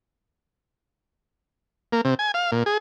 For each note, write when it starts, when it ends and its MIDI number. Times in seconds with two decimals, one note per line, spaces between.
1.93 2.01 58
2.05 2.14 48
2.19 2.32 80
2.34 2.51 77
2.52 2.63 46
2.66 2.78 68